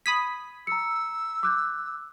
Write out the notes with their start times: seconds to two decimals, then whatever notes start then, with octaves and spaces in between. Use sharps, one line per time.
0.06 B5 D#6 G#6 B6
0.67 A#5 E6 C#7
1.43 D6 F#6 G6